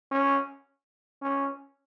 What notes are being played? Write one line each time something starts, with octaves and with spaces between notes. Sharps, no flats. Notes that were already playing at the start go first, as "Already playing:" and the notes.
C#4
C#4